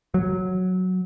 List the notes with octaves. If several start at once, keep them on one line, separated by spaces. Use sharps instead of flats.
F#3